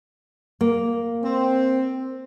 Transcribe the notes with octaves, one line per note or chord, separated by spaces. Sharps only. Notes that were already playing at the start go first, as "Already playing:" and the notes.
A#3
C4